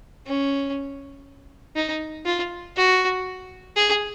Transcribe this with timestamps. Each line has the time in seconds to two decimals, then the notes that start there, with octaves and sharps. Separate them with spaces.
0.26 C#4
1.76 D#4
2.25 F4
2.76 F#4
3.76 G#4